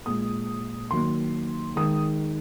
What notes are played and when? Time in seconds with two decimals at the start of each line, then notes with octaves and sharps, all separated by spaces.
0.06 A#2 G#3 D#6
0.91 D#3 F#3 A#3 C6
1.76 D#3 G#3 D#6